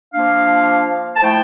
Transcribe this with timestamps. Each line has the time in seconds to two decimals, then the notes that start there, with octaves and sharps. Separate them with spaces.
0.14 F3 A#3 D4 F5
1.16 A5
1.22 F3 A3 E4 G5